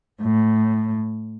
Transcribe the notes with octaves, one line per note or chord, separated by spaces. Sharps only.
A2